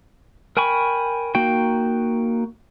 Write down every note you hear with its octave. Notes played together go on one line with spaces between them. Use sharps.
A#4 G5 G#5 B5 C#6
A#3 D#4 F#4 G5